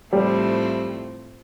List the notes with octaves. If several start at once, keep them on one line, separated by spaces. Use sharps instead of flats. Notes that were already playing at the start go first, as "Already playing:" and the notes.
A2 F3 G3 A3 C4 E4